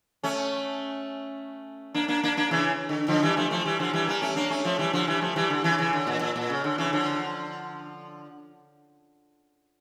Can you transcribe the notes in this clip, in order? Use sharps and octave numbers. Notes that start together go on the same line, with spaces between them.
A3 C#4
A#3 D4
A#3 D4
A#3 D4
A#3 D4
C#3 E3
D3
D3 F3
E3 G3
F3 A3
F3 A3
E3 G3
D3 F3
E3 G3
G3 A#3
A3 C#4
A#3 D4
A3 C#4
F3 A3
E3 G3
D3 F3
E3 G3
F3 A3
E3 G3
D3
C#3 E3
C#3 E3
D3
A#2
A#2
A#2
C#3
D3
C#3 E3
D3 F3